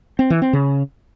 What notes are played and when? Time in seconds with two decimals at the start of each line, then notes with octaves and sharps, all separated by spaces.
0.19 C4
0.30 E3
0.42 C4
0.53 C#3